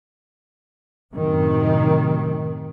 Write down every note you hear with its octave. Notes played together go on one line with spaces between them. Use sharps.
F#2 A2 C3 D#3